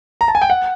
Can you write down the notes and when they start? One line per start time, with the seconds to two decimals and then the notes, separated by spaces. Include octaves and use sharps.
0.21 A#5
0.28 A5
0.35 G#5
0.42 G5
0.50 F#5